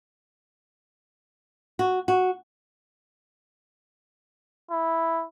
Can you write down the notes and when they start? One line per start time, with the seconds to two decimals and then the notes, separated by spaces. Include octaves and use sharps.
1.79 F#4
2.08 F#4
4.71 E4